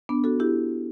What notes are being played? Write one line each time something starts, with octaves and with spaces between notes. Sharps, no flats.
B3 D4
F#4 A4
E4 G4